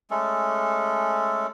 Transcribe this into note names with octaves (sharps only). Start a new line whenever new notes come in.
G#3 A3 C#4 A4